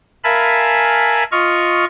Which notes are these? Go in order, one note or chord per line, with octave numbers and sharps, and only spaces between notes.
A#4 E5 F5 G#5 A5 B5
F4 D#5 C#6 F6